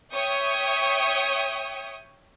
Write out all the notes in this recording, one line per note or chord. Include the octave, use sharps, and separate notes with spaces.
C#5 E5 G5 C#6 D#6